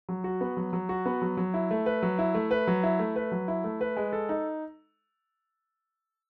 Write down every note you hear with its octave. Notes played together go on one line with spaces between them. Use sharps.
F#3
F#4
B3
F#3
F#3
F#4
B3
F#3
F#3
E4
A3
B4
F#3
E4
A3
B4
F#3
E4
A3
B4
F#3
E4
A3
B4
G#3
A4
D#4